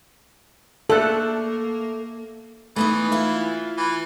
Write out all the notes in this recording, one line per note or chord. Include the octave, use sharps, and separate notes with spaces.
A3 A#3 A4 F#6
E3 A3 B3 D#4
E4 F4
E3